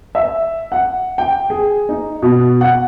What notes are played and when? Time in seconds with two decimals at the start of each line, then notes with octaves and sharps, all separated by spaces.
0.15 E5
0.72 F#5
1.18 G5
1.50 G#4
1.89 D#4
2.22 B2
2.61 F#5